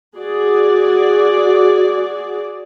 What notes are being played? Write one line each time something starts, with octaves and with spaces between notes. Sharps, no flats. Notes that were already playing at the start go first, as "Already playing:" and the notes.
F#4 G#4 D5